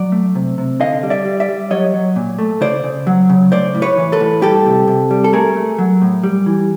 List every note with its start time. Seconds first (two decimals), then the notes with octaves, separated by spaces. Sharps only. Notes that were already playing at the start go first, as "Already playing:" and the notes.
Already playing: F#3 D5
0.12 A3
0.35 C3
0.58 C3
0.80 D3 D#5 F5
1.03 G3
1.10 D5 E5
1.25 G3
1.40 D5 E5
1.49 G3
1.71 F#3 C#5 D#5
1.94 F#3
2.16 A#2
2.39 A3
2.61 C#3 C5 D5
2.84 C#3
3.07 F#3
3.29 C#3
3.52 A3 C5 D5
3.75 A2
3.82 B4 C#5
3.97 E3
4.12 A4 B4
4.20 A2
4.42 G3 G4 A4
4.66 C3
4.88 C3
5.11 G3
5.24 A4
5.33 A3 G#4 A#4
5.56 A3
5.79 F#3
6.02 A2
6.23 G3
6.46 E3